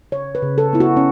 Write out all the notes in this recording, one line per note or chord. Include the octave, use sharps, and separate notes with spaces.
C#3 C#5
B4
C#3
A4
B3 E4
F#4
C#4